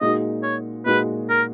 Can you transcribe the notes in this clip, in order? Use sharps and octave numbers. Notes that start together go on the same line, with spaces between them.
A#2 G#3 D#4 F#4 D#5
C#5
A#2 G#3 D#4 F#4 B4
A#4